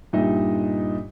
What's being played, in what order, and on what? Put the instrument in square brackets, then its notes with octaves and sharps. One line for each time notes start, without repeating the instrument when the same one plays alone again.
[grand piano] G2 A#2 D#4 G4 D#5 E5